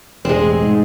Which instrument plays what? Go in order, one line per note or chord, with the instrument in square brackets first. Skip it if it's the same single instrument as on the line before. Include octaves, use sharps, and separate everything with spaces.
[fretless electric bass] E1 A1 [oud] G#3 C4
[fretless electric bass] G#2